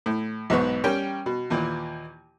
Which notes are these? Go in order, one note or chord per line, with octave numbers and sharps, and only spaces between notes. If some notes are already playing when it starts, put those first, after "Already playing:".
A2
B1 G#2 B3 C#6
G3 C#4 A#4 G5
B2
D#2 A#2 E3